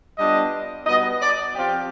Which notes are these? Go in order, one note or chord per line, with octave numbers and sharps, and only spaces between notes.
G3 B3 D4 F4 D#5
B2 G3 B3 D#5
D5
F3 C4 F4 G4